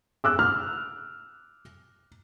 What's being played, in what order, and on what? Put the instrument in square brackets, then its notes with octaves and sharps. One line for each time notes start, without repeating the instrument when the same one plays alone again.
[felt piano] D6 E6 F#6
[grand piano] F6